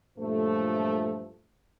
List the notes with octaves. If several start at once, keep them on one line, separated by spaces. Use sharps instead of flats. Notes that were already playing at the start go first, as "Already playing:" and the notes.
G2 A#2 F3 F#3 A3